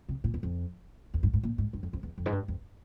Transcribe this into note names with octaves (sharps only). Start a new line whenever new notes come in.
C3
A#2
E2
F2
E2
G2
G#2
A#2
G#2
G2
F2
F2
E2
F2
G#2
G2
F2